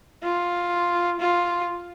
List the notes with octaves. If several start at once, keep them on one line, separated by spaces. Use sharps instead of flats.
F4
F4